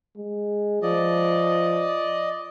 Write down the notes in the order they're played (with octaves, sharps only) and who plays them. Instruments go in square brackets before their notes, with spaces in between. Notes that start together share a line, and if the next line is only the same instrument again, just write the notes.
[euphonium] G#3
[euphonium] F3 [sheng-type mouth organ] D5 D#5